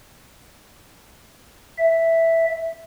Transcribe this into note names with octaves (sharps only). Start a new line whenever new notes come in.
E5